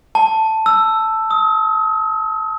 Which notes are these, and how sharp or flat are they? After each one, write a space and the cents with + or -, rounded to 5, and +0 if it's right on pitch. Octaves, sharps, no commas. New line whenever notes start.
A5 +5
E6 +5
D#6 +40